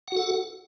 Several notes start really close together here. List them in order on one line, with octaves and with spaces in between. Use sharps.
F#5 F#4 A4